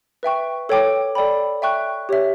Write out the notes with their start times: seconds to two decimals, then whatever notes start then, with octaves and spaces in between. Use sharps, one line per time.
0.23 B4 E5 G5 C#6
0.69 A4 C#5 G5 D6
1.15 A4 D5 G5 B5
1.62 E5 G5 C#6 F#6
2.09 G4 C#5 E5